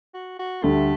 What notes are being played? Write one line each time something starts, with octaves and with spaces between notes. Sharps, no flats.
F#4
F#4
D2 D3 G3 A3